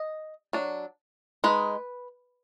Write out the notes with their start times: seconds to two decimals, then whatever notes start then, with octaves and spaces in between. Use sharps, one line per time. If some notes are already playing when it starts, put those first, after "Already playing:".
Already playing: D#5
0.53 F#3 D4
1.44 G#3 D#4 B4